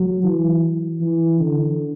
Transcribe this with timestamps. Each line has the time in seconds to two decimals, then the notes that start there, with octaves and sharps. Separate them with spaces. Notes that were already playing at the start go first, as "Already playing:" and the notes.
Already playing: F#3
0.24 E3
1.01 E3
1.40 D3